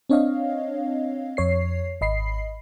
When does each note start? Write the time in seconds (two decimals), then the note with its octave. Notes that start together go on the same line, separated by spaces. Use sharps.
0.10 C4 D4 C#5 D#5 F5
1.37 F2 C#5 C7
2.01 G#1 D#5 B5 C7